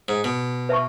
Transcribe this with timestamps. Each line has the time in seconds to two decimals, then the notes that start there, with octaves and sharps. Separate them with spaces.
0.08 G#2
0.24 B2
0.69 B4 E5 A5 C#6